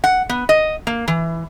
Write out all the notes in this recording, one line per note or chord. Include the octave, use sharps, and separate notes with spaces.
F#5
B3
D#5
A#3
E3